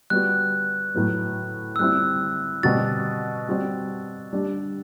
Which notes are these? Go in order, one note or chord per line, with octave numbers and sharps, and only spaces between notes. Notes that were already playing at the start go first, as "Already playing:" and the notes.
G3 B3 F#4 F#6
A2 F#3 B3
E6
G3 C4 E4 F#6
B2 G3 C4 F#4 A6
G3 C4 F#4
G3 D4 G4